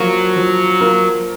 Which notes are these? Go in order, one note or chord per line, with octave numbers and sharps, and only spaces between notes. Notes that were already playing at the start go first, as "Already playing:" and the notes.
Already playing: F3 F#3 A#3 F4
F3
A#3 F4